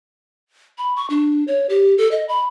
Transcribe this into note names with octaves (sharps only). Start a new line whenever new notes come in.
B5
C#6
D4
C#5
G4
A4
D#5
B5